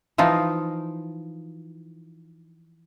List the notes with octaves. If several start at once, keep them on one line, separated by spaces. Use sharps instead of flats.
E3 F3 D#4 F4